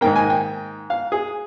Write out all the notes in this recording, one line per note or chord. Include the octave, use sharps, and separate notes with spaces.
G#2 D#3 A#3 G5
G#5
G5
F5
G#4